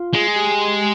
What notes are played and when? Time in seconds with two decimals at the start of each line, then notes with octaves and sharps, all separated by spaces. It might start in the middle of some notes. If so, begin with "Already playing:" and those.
Already playing: F4
0.14 G#3
0.36 G4